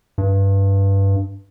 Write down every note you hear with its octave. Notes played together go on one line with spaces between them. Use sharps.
G2